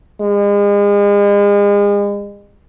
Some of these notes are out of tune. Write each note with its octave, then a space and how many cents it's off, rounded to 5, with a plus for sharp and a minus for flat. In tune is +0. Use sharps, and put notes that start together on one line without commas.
G#3 -40